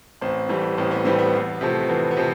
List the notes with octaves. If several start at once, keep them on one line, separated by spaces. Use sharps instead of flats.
A1 C4
A2 E3 G3
A1 C4
B3
A2 E3 G3 C4
B3
E2
C3 F3 A3
E2 B3
B3
C3 F3